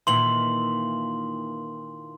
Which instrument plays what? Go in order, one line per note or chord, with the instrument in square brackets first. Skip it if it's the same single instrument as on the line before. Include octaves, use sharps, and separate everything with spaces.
[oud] A#2 D#3 E3 [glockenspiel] C6 F#7